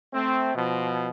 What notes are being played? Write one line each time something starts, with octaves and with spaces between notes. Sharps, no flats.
A3 C4
B2 F3